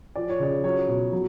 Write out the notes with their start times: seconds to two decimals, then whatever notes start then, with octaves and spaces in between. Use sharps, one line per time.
0.16 F3 D5
0.29 C#5
0.40 C#3 D5
0.64 F#3 C#5
0.88 B2
1.12 F#3